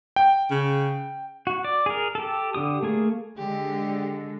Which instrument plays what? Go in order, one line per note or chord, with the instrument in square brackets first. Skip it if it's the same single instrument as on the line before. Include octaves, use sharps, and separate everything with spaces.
[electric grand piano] G5
[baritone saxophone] C#3
[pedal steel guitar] F#4
D5
G#4 A#4
G4 A4
D3 G4 D#6
A3 A#3 G#4
[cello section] D3 G#3 [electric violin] G4